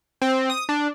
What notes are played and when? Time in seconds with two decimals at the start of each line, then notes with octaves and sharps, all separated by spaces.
0.22 C4
0.50 D#6
0.69 D4